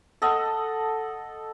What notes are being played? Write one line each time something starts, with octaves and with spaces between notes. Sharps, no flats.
A4 D#5 F#5